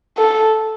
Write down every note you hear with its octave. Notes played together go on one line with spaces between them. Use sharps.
A4